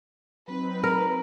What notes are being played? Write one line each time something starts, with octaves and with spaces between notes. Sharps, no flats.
F#3 C4 D#4 B4
A#4